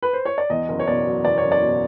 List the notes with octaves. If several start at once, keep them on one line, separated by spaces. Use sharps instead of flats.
B4
C5
C#5
D5
E2 D#5
F#1
C#5
B2 D5
F#3
E2 D5
C#5
F#1
D5
B2